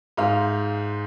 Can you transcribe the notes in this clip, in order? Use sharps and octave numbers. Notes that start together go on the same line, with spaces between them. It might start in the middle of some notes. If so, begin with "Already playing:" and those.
G#2 G#3 F5